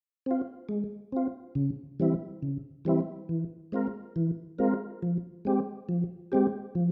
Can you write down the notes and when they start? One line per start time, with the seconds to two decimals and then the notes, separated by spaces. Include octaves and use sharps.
0.26 C4 F4
0.69 G#3
1.12 C4 F4
1.55 C#3
2.00 E3 G3 C4 E4
2.42 C#3
2.85 E3 G3 C4 E4
3.29 E3
3.72 G#3 C4 F4 A#4
4.16 E3
4.58 G#3 C4 F4 A#4
5.02 F3
5.45 G#3 C4 G4
5.89 F3
6.32 G#3 C4 G4
6.75 F3